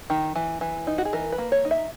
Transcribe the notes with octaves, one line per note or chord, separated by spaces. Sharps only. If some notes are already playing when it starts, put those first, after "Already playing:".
D#3
E3
E3
D#4
F#4
G#4
E3 A#4
B4
A#3
C#5
D#4
E5